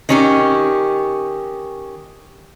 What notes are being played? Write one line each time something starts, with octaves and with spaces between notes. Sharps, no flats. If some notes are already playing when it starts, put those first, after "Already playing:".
D#3 C#4 G4